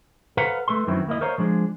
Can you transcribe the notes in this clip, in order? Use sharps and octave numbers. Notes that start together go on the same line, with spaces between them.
A4 B4 C5 F5 F#5 A#5
A3 A4 B4 C6
F#2 D#3 E3 F#3 C4 E4
D#2 A#3 E4 D#5
A#4 C5 C#5 D#5 F5 A#5
F3 G#3 D4 C5